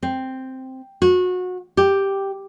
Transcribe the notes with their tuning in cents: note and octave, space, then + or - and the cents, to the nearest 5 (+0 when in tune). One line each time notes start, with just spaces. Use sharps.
C4 +0
F#4 -25
G4 +0